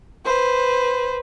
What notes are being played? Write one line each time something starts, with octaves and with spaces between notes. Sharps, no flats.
B4 C5